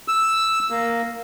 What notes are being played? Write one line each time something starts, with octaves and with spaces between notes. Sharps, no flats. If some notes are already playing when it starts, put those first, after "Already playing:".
E6
A#3